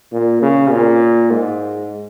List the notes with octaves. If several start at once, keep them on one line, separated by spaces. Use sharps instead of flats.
A#2
C#3
A#2
G#2